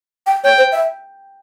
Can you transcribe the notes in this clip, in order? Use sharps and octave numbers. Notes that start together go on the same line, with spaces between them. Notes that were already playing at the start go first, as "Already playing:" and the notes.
G5
C#5 G5
C5
E5